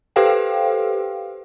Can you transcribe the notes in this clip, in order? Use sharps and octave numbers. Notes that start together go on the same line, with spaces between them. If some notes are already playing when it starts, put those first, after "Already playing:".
G4 A4 B4 C5 F5 G5